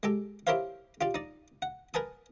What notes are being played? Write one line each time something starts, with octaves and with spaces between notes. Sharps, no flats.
G#3 G4 A4
E4 G4 A#4 C5 C#5 F5
F4 G4 D5
D#4 D5
F#5
A#4 B4 G#5 A5 D#6